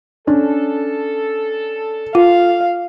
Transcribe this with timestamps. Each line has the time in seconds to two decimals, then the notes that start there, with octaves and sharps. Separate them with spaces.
0.27 C#4 D4 A4
2.15 F4 F5